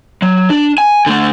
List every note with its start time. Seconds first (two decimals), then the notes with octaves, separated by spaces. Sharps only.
0.22 F#3
0.50 D4
0.78 G#5
1.06 D3 A3